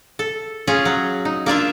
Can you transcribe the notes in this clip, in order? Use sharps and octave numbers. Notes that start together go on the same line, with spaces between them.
A4
C#4 F4 G#4
F#3
D#4
A#3 D4 F4 E5